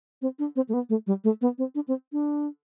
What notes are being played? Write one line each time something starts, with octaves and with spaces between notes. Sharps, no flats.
C4
D4
C4
A3
B3
A3
G3
A3
B3
C4
D4
C4
D4